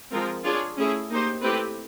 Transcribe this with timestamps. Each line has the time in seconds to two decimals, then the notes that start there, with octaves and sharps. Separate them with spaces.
0.11 F3 G#3 C4 F4 A#4
0.44 D4 F4 G#4 C#5
0.77 A3 C#4 E4 G#4
1.10 A#3 D#4 G4 C5
1.42 A3 C4 E4 G4 B4